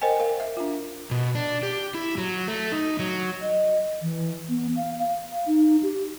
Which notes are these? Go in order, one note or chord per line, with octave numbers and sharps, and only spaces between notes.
A#4 C5 D#5 G5 G#5
A#4 F5
E5
D4 F4
B2
D4
G4
E4
F#3
A3
D#4
F#3
D#5
E3
B3
F5
F5
D#4
G4